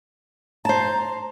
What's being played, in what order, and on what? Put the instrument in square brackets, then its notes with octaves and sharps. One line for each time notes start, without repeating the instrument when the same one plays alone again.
[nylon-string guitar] C5 A5 [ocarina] A#5